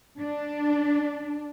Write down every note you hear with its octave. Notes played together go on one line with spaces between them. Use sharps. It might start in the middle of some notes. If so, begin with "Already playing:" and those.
D4